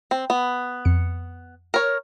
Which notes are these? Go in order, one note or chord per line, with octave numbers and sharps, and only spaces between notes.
C4
B3
F2 C#7
A#4 C#5